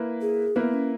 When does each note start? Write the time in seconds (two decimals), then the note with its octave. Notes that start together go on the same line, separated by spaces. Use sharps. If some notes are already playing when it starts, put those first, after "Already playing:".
Already playing: A#3 E4 B4
0.21 G#4
0.56 A#3 B3 E4 B4
0.74 C#4